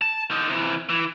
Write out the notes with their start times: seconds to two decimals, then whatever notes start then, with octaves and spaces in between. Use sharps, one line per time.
0.01 A5
0.31 D3 D#4
0.49 C3 E3
0.89 E3